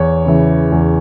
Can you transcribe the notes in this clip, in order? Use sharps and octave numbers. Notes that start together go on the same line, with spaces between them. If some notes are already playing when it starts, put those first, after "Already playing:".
Already playing: E2 C#5
C#3 E3
E2